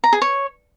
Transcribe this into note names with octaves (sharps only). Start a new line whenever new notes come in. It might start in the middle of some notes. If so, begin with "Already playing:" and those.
A#5
G#4
C#5